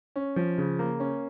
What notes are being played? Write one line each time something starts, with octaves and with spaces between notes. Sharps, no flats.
C#4
F3
C#3
A#3
C#4